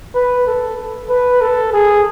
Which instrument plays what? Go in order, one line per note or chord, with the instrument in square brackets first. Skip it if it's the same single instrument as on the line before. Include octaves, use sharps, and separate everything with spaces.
[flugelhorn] B4
A4
B4
A4
G#4